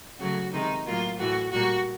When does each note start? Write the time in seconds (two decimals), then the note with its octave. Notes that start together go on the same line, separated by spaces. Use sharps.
0.19 C#3 F#3 A3 F#4
0.52 C3 D#3 G#3 D#4
0.86 A2 F#3 A#3 F4
1.18 A2 E3 A3 F#4
1.51 A#2 G3 A#3 F#4